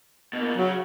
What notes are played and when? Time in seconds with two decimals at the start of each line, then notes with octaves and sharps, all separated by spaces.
0.33 B2 A#3
0.57 C#3 F#3